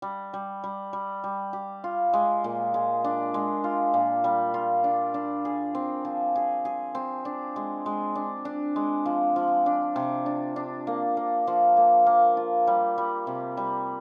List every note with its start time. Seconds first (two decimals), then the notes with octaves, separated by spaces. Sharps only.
0.02 G3
0.33 G3
0.64 G3
0.93 G3
1.24 G3
1.53 G4
1.84 F4
2.13 G#3
2.44 A#2
2.74 G#3
3.04 D4
3.34 G#3
3.64 F4
3.94 A#2
4.24 G3
4.54 F4
4.84 D4
5.14 D4
5.45 G#4
5.75 C4
6.05 F3
6.36 G#4
6.65 G#4
6.95 C4
7.25 D4
7.56 G#3
7.86 G#3
8.15 D4
8.45 D4
8.76 G#3
9.06 F3
9.36 F3
9.66 D4
9.96 C3
10.26 D4
10.56 D4
10.87 A#3
11.17 A#3
11.47 F3
11.77 A#3
12.06 A#3
12.37 F4
12.67 G3
12.98 G3
13.27 C3
13.57 G3